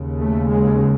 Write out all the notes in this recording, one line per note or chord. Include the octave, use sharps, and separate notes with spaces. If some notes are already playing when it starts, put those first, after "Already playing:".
Already playing: D#2 C#3
A3
G#3